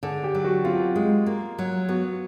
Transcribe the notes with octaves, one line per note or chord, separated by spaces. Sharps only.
D3 G#4
G4
F#3
F#4
C4 F4
G#3
A#3
F#3
B3 F#4